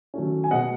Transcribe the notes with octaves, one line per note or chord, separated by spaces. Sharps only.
D#3 F#3 A3 C#4
G#5
B2 G#3 B3 D#5 F#5